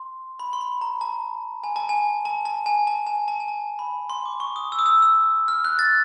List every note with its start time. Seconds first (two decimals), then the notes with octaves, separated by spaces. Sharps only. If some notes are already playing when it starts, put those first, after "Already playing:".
Already playing: C6
0.39 B5
0.53 C6
0.61 B5
0.81 A#5
1.01 A5
1.64 G#5
1.76 A5
1.89 G#5
2.25 A5
2.45 A5
2.66 G#5
2.87 A5
3.07 G#5
3.28 A5
3.40 G#5
3.48 A5
3.79 B5
4.10 C6
4.26 D6
4.40 C#6
4.56 D#6
4.72 E6
4.79 D#6
4.86 E6
5.02 E6
5.48 F6
5.65 F#6
5.79 A6